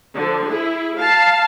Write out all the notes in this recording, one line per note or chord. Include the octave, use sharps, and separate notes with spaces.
D3 F3
E4 G#4
F5 A5